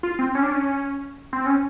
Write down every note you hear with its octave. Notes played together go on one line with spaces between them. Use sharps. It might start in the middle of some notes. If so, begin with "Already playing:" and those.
F4
C4
C#4
D4
C#4
C4
C#4